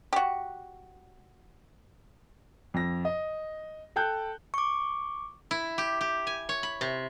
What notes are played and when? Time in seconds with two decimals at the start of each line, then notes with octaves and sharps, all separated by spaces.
0.13 F#4 G4
2.74 F2 A#6
3.05 D#5
3.96 A4 G5 A5 F#6 G6
4.54 C#6 D6
5.51 E4
5.78 G4
6.01 G4
6.27 G#5
6.49 C#5
6.63 B5
6.81 C3